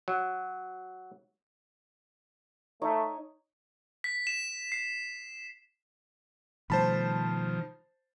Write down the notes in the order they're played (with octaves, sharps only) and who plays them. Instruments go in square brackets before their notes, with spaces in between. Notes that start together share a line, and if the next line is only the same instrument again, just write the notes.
[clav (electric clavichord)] F#3
[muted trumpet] A3 [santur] D#4 C#5
[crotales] B6
E7
C7
[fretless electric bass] B2 G3 A3 [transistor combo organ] D#3 F3 [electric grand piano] C5 A5 B5